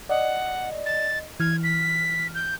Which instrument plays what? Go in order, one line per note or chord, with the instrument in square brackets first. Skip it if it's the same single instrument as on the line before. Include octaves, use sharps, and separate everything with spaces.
[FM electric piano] D5 D#5 [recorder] F#5
[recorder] A6
[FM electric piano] E3 F6 [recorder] G#6
[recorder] B6
G6